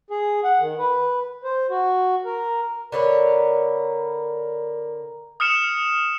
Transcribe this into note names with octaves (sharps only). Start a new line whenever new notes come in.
G#4
F#5
D#3
B4
C5
F#4
A#4
D3 A#4 B4 C#5
D#6 F6 C#7 E7